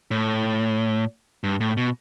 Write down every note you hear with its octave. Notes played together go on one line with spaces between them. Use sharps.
A2
G2
A2
B2